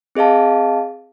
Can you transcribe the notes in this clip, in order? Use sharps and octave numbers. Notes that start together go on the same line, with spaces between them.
C4 G#4 D#5 F5 A5